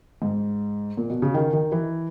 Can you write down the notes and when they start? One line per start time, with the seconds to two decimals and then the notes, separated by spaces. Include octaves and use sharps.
0.22 G#2
0.97 A#2
1.10 B2
1.22 C#3
1.34 D#3
1.53 D#3
1.72 E3